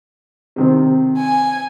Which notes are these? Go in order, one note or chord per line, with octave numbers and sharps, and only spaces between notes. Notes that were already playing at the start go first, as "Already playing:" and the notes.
C3 D#3 C4
G#5